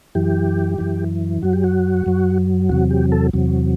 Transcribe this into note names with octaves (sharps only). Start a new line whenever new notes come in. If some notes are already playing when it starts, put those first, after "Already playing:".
F#2 E3 G4
F#2 E3
F#2 F#3 F#4
G4
F#4
F#2 F#3
E2 C3 F#3 F#4
G4
A4
E2 C3 F#3